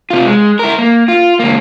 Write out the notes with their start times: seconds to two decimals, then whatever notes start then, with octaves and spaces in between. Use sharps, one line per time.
0.10 C3 F4
0.26 G#3
0.59 E4 A#4
0.79 A#3
1.08 F4
1.39 C#2 A#3